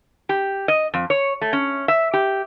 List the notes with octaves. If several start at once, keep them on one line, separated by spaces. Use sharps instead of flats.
G4
D#5
F2
C#5
A3
C#4
E5
G4